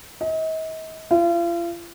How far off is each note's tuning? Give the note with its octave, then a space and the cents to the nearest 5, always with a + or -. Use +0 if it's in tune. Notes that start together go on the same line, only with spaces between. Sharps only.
D#5 +40
F4 -40